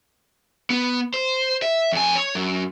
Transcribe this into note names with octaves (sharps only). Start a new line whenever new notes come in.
B3
C5
E5
F2 G#5
C#5
F#2